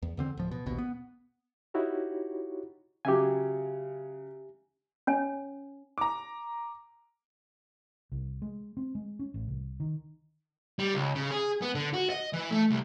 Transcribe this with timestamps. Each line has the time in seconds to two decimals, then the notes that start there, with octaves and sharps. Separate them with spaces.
0.02 E2
0.17 E2 D3 C4
0.37 D1 F3
0.51 B2
0.66 A#1 D#2 B2
0.78 B3
1.74 D#4 E4 F#4 G4 C#5
3.05 C#3 F#3 G4 E5 G#5
5.07 C#4 C#5 G#5
5.98 A#5 D6
8.12 C2
8.42 G#3
8.77 C4
8.95 G#3
9.19 C#4
9.34 A1
9.48 C2
9.80 D#3
10.79 G3
10.94 C#2
11.15 C#3
11.31 G#4
11.62 B3
11.75 D3
11.94 F#4
12.10 D#5
12.33 E3
12.51 A3
12.70 C2